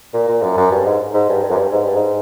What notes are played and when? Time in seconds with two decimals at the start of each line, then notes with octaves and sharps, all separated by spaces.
0.14 A#2
0.28 A#2
0.43 F#2
0.57 F#2
0.72 G2
0.85 G#2
1.14 G#2
1.29 G2
1.43 G2
1.51 F#2
1.57 G2
1.72 G#2
1.84 G2
1.96 G#2